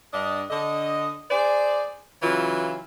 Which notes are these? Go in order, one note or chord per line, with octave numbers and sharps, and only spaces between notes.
G2 D4 D#5
D3 D#5
G#4 C5 D5
C#3 E3 F#3 F4